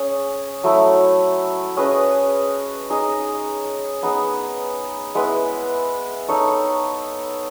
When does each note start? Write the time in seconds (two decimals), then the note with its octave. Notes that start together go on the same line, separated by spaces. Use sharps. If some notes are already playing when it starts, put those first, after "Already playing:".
Already playing: C#4 G#4
0.64 F#3 A3 E4
1.76 C#4 G#4 B4 D#5
2.90 D#4 G#4 D#5
4.03 B3 D#4 G#4
5.15 G#3 B3 E4 B4
6.29 D#4 A4 C#5